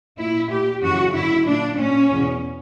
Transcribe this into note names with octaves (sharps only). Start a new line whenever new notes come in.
A#2 E4
A#2 G4
F#2 C#3 E3 F#4
F#2 D3 E4
A#2 D4
A#2 C#4
E2 B2